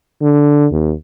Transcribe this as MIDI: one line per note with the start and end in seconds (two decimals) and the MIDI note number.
0.22 0.66 50
0.71 0.93 39